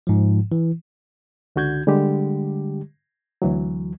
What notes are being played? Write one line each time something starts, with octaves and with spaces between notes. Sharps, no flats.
G#2 F3
E3
C#2 D3 F#4 G6 G#6
D3 G3 G#3 G4
D2 E3 F#3